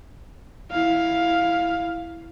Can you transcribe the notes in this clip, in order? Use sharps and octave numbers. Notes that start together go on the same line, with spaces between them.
E4 F5